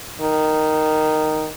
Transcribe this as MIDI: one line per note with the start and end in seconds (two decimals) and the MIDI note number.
0.21 1.47 51